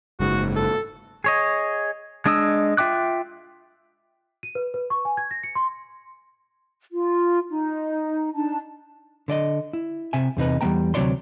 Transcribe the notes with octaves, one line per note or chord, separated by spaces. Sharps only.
F#1 G#2 F#4
A4
G#4 C#5 D#5
G#3 D4 D#5 D#6 E6
F4 E5 G5 D6 F#6
D#7
B4
B4
C#6
G#5
G#6
A#6
C#7
C6
F4
D#4
D4 D#4 A5
D3 D5 D#5
E4
C3 E5 G#5
E2 C3 D#4 B4
E2 G3 G#3 B3 G5 A#5
D2 C3 F#3 C#5 D5 C6